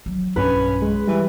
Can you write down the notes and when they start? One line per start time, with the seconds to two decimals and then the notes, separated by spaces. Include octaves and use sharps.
0.06 F#3
0.36 B1 G2 C#4 B4
0.82 G#3
1.08 E3 G3